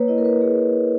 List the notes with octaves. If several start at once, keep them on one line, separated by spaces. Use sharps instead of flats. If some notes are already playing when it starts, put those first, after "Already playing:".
Already playing: A#3 B4 C#5
E4 D#5
A#4
B4
A#3 G#4
A#3